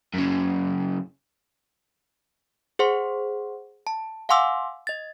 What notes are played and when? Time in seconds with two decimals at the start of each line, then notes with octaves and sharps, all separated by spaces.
0.14 F#2 C#3
2.79 G#4 C5 F#5 C6
3.87 A5
4.29 F5 F#5 G#5 C6 D6 E6
4.87 D#5 A6